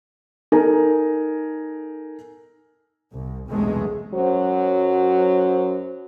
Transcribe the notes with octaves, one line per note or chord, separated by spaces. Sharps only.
D#4 A4 A#4 G#5
C2
B1 E2 G2 C3 G#3 A3
F#2 F#3 C5